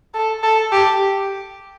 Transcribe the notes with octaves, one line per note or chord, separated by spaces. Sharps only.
A4
A4
G4